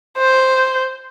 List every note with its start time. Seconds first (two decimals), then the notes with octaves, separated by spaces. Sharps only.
0.18 C5